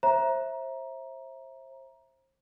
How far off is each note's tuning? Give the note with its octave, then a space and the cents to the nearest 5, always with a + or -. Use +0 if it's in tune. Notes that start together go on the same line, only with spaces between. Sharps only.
C5 +35 E5 +0 A#5 +20